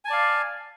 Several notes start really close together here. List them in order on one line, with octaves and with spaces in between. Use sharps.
G#5 A5 D5 F5